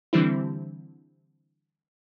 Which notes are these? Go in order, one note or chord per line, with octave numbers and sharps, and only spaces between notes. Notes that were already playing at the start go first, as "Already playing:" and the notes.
D3 E3 G3 C4 E4